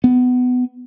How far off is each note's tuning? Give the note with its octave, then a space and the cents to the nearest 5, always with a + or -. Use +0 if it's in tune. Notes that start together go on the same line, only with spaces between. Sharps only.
B3 +20